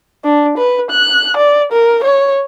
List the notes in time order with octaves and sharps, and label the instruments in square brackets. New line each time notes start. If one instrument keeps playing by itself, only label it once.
[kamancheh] D4
B4
F#6
D5
A#4
C#5